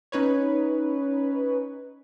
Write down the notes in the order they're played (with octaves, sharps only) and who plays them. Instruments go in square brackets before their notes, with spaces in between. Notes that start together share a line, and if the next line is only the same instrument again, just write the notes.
[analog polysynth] C#4 D#4 B4 C#5